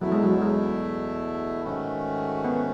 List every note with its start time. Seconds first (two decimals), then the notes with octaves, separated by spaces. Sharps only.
0.01 E2 B2 F#3 A3 E4
0.12 G#3
0.23 F#3
0.42 G#3
1.63 G#2 D#3 A3 C#4 F#4
2.45 B3